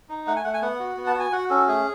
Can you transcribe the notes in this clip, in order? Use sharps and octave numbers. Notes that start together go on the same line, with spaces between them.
D#4
A3 F#5
G#5
A3 F#5
G#5
B3 F#5
F#4
B3
A5
F#4 G#5
F#4 F#5
C#4 A4
A3 G#4